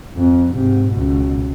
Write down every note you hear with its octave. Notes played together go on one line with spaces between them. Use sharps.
F2
G#2 C3
C#2 B2